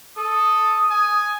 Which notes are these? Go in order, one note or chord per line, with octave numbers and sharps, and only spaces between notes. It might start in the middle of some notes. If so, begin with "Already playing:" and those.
A4 D#6
G#5